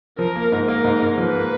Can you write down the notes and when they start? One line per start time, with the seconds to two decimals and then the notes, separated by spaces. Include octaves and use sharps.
0.19 F3 A#4
0.36 A#3
0.52 G#2
0.68 A#3 A#4
0.84 G#2
1.02 G#2
1.18 F3 B4
1.35 A#3